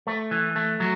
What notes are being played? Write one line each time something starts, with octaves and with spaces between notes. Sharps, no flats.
A3
E3
A3
F#3